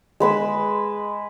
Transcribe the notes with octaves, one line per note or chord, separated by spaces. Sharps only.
G#3 B4 E6